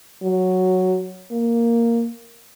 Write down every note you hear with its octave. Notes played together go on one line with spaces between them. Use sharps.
F#3
A#3